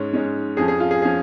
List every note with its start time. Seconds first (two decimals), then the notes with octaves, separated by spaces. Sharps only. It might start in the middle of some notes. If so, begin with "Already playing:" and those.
Already playing: G#2 G#3 C#4 C#5
0.13 G#2 G#3 C#4
0.57 F2 F3 C#4 G#4
0.68 G#4
0.80 F4
0.91 G#4
1.02 F3 C#4 G#4